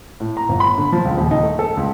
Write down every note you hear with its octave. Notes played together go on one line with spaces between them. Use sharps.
A2
A#5
G1
B5
D3
F3
C#2
D#1
D#4
A3
A4
C#2